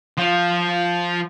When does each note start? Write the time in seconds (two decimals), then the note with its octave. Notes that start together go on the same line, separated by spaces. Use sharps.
0.17 F3 F4